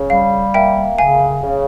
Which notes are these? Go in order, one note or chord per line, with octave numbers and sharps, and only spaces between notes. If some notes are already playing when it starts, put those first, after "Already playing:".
Already playing: C#3
G3 F5
A#3 E5 G5
C#3 F5 G#5
C#3